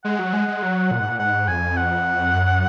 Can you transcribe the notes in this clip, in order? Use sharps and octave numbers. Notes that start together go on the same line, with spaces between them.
G#3 F#5
F#3
G#3
G#3
F#3
A#2
G#2
A#2
G#2 F#5
F2 G#5
F#5
F#2